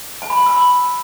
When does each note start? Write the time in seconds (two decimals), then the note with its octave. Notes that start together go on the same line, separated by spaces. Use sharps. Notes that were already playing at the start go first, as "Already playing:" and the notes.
0.22 G#5
0.30 B5
0.38 G#5
0.46 E6
0.55 B5